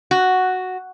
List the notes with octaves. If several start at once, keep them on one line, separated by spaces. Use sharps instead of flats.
F#4